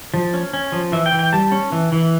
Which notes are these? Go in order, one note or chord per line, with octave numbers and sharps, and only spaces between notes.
F3
C#4
C#4
F3
E3 E5
G5
E3
G5
G3 A5
C#4
E3
E3